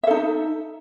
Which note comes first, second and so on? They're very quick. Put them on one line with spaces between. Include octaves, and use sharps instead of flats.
E5 A4 D#4